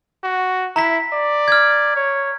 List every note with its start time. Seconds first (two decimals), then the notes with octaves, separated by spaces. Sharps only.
0.24 F#4
0.76 E4 A#5 B6
1.13 D5
1.48 F6 G#6
1.96 C#5